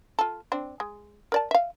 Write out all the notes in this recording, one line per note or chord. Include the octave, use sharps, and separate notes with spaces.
F4 A4
C4 D4
G#3
A#4 D5 A5
E5 F5